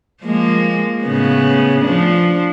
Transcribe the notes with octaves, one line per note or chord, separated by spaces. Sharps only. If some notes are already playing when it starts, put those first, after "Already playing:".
F3 G#3 A#3
A2 C#3 B3
F3 D4